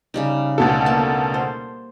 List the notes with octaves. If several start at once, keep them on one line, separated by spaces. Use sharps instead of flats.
C#3 G3 D#4
D2 B2 A4
A#3 A5
C5